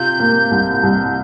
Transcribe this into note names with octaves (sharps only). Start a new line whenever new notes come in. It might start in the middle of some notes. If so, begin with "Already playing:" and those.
Already playing: C3 F4 G6
A#3
C2
C2